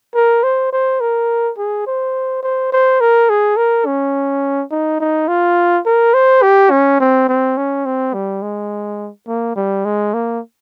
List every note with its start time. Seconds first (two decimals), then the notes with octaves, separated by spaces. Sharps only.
0.15 A#4
0.43 C5
0.72 C5
1.01 A#4
1.58 G#4
1.87 C5
2.43 C5
2.72 C5
3.01 A#4
3.30 G#4
3.57 A#4
3.86 C#4
4.71 D#4
5.00 D#4
5.28 F4
5.86 A#4
6.14 C5
6.42 G4
6.71 C#4
7.00 C4
7.29 C4
7.57 C#4
7.86 C4
8.14 G3
8.42 G#3
9.28 A#3
9.56 G3
9.85 G#3
10.14 A#3